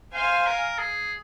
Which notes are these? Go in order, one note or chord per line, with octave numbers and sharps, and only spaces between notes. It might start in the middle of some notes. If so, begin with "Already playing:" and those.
C5 F5 G#5
A#4
G#4